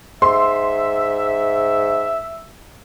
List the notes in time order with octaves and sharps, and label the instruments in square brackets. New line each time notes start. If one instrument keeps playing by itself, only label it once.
[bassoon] G#2 [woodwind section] E5 [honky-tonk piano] C6